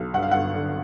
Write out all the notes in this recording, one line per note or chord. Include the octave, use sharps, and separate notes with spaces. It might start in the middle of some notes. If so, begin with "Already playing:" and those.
Already playing: B1
G2 F#5
F5
G1 F#5
D3